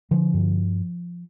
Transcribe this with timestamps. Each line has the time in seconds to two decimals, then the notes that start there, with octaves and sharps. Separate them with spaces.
0.11 D3 F3
0.34 G2